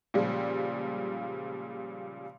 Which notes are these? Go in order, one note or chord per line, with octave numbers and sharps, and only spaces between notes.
A#2 C#3 F3 G3 G#3